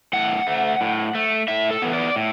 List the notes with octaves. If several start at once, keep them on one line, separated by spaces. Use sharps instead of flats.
A2 F#5
A3
A2
A3
A2 E5
A4
E3 B3
D5
A2